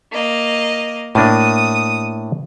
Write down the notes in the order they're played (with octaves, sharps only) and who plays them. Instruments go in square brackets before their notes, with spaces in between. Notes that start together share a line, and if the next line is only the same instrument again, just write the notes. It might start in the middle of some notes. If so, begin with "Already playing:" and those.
[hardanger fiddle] A#3 D#5
[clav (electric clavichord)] A2 A#3 D4 [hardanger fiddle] D#6